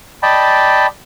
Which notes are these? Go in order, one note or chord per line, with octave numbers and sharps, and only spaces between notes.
D5 D#5 G5 A5 B5